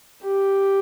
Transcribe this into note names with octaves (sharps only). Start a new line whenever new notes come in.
G4